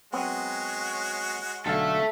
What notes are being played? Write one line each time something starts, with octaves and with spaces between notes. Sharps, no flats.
F#3 G#3 B3 C4 F#4 C#5
B1 D3 A4 E5 F5